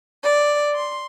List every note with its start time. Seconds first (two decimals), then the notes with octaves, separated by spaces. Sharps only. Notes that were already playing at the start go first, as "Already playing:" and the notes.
0.23 D5
0.74 C6